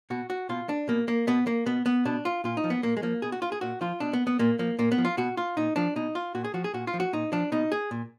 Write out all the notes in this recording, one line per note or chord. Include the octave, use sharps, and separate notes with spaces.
B2 F#4
F#4
B2 F4
D4
B2 A#3
A#3
B2 B3
A#3
B2 B3
B3
B2 D4
F4
A#2 F4
D#4
F3
B3
A#2 A#3
G#3
F3 A#3
B2 G#4
F#4
F4
G#4
A#2 F#4
F3 F4
B2 D4
B3
B3
A#2 A#3
F3 A#3
A#2 A#3
B3
F3
F4
B2 F#4
F4
A#2 D#4
F3 D4
B2 D#4
F4
A#2 F#4
G#4
F3 F#4
G#4
A#2 F#4
F4
F3
F#4
A#2 D#4
F3 D4
B2 D#4
G#4
A#2